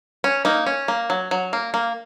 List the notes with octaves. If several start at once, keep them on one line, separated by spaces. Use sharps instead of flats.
C#4
A#3 D#4
C#4
A#3
F#3
F#3
A#3
A#3